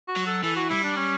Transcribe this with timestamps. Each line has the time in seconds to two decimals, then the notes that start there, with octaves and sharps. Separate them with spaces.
0.08 F#4
0.17 F#3
0.27 A4
0.44 E3 A4
0.56 F#4
0.70 G3 E4
0.84 D4
0.97 C#4